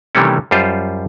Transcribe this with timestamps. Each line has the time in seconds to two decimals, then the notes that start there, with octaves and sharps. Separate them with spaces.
0.15 C3 D#3 E3 G3 A3 C#4
0.51 F#2 G3 F4 C5